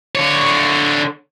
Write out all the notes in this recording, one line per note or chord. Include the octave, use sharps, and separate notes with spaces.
D3 C#5